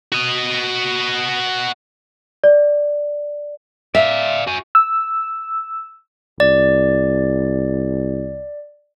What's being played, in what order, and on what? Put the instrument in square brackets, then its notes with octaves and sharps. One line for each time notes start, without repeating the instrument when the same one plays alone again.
[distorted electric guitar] F#4 D#5
[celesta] D5
[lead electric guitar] D5 F5 [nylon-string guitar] E5
[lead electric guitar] F#4 G#5
[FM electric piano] E6
[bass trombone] C2 [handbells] D5